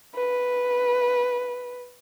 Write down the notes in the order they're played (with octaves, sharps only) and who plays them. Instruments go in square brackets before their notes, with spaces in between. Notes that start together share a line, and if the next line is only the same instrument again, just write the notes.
[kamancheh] B4